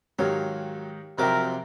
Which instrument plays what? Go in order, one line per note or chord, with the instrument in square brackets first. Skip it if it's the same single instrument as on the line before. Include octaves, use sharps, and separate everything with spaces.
[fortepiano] G#2 D#3 [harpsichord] F#3 [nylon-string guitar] G4 C#5 F5
[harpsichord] F2 F#3 D6 [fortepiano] C3 E5 G5 [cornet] A#4